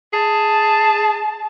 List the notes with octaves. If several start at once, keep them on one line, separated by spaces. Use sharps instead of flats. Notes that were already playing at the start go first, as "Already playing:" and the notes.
G#4 A5